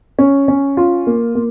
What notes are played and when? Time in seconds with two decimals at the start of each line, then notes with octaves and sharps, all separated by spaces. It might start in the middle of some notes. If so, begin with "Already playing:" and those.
0.19 C#4
0.48 C#4
0.77 F4
1.07 A#3
1.35 A#3